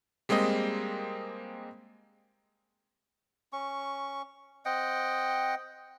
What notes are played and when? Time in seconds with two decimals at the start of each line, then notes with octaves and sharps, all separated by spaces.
0.29 G3 G#3 A#3 C4 D#5
3.53 C#4 C#6
4.65 C4 D#5 F#5 G5